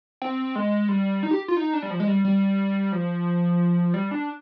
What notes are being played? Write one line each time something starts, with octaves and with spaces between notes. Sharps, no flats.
C4
G#3
G3
D#4
G4
F4
D#4
D4
G3
F3
G#3
G3
G3
F3
G3
D4